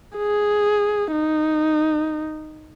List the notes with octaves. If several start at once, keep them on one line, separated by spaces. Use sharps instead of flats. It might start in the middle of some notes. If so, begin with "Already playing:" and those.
G#4
D#4